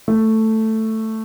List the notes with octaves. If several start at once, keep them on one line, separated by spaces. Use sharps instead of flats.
A3